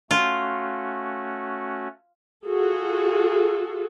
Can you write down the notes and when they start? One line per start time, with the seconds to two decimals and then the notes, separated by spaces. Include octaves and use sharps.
0.11 A3 C#4 F4 F#4
2.46 F4 F#4 G#4 A4